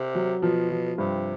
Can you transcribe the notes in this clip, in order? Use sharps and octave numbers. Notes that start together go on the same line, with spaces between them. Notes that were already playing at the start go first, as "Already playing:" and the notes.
Already playing: C3
F#3
B2 F3
F3
G2 C3